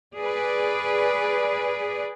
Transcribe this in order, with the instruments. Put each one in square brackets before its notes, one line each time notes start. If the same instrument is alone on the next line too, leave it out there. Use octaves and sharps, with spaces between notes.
[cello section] G#4 B4 D5